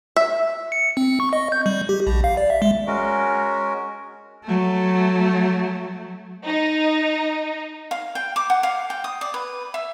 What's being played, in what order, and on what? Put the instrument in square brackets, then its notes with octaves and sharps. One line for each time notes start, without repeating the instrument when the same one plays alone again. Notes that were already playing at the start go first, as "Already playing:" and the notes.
[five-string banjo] E5
[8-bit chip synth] C#7
C4
C#6
D#5
G6
G3
G4
A#1
F5
D5
E5
G#3
[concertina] G#3 C#4 F#4 A#4
[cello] F#3 A3
[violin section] D#4
[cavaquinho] F5
G5
D6
F#5
F5
G5
D#6
D5
B4
E5